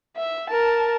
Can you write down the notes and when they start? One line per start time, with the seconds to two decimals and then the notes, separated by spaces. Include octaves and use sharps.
0.17 E5
0.50 A#4 A5